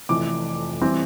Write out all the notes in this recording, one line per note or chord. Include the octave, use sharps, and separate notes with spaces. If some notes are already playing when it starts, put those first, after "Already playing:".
F1 F2 E3 D6
E3 G3 C4